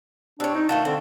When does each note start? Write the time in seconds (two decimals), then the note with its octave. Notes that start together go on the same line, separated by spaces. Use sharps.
0.40 G3 C4 D4 C#5
0.55 D#4
0.69 D#3 A3 F4 F#4 A5
0.85 D3 C4